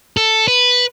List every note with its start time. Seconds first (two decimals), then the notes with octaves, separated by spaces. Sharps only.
0.17 A4
0.48 B4